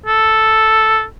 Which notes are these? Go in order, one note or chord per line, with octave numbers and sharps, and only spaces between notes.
A4